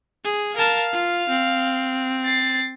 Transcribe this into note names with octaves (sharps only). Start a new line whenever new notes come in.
G#4
A#4 F5 A5
F4
C4
A6 C7